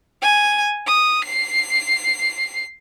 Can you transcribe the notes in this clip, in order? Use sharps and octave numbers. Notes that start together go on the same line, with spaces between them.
G#5
D#6
C7